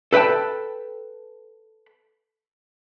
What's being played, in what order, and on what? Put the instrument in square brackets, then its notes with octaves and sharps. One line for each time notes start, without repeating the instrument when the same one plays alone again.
[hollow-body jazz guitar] A4 B4 D#5 G5 A5